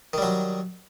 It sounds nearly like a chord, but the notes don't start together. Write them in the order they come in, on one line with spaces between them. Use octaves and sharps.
D#3 G3 F#3